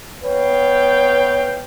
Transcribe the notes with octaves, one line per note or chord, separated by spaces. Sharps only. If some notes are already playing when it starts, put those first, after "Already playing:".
B3 B4 C#5 F5 G5